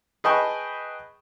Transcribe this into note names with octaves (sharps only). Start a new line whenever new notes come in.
G#4 B4 D#5 G5 A5 C#6